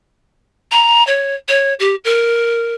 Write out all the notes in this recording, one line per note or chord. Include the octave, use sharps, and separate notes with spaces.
A#5
C#5
C#5
G4
A#4